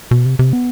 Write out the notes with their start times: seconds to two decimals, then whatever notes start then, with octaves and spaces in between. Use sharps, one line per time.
0.11 B2
0.26 C3
0.39 C3
0.53 B3